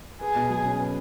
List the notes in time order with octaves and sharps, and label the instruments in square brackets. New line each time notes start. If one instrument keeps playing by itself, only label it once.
[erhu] G#4 [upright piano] B4
[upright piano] B2
F#3
C#4
B4